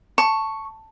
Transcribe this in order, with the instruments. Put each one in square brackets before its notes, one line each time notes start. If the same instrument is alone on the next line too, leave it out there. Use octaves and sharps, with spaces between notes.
[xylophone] A5 [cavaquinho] C#6